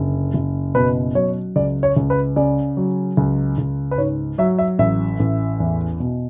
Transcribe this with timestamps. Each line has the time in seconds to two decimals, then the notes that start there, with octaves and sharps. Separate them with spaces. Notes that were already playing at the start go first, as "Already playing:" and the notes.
Already playing: F#1 D3
0.34 F#1
0.75 B2 B4
1.15 F#3 C#5
1.56 C#2 D5
1.83 C#5
1.96 C#2
2.10 B4
2.36 C#3 D5
2.77 F#3
3.17 C#2
3.58 C#2
3.91 B4
3.98 G#2 C#5
4.38 F#3 E5
4.58 E5
4.79 A1 E5
5.20 A1
5.60 E2
6.00 B2